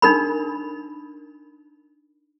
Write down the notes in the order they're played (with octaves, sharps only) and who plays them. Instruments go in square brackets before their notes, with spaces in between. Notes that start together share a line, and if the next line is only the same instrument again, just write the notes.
[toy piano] D4 D#4 A#4 B5